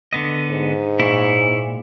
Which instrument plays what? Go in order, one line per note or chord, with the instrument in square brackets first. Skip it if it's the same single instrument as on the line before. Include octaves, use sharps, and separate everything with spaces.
[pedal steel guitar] D3 B3 D#5
[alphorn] G#2
[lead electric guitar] A#2 [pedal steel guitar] E4 C#5